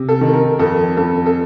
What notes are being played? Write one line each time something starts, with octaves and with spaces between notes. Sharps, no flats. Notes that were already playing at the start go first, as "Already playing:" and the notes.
Already playing: C3
A4
D#3
A#4
F2 A4
F2 A4
A4